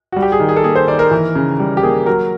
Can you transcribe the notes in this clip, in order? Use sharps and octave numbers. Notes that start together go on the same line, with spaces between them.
G3 F#4
G4
G#4
D#3
G#4
A4
A#3 G#4
C5
D#3 D5
A#4
E3
C#3
G3
G4
A#3 G#4
F#3 A#4